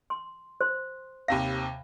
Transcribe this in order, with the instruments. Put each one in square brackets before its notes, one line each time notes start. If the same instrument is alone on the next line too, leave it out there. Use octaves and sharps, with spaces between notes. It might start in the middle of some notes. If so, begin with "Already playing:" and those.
[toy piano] C6
C5 C6
[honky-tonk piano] D#2 C3 A#6 [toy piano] F5 B5